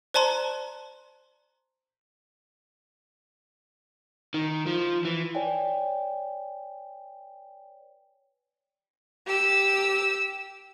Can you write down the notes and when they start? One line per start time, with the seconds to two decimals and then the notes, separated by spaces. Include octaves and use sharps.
0.14 C5 D5 A5 A#5 C6
4.34 D#3
4.67 F3
5.05 E3
5.35 B4 C#5 D5 G5 G#5
9.26 G4 E6